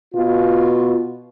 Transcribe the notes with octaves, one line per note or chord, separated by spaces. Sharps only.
B2 F4